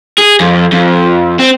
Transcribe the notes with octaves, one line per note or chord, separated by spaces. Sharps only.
G#4
F2
F2
C4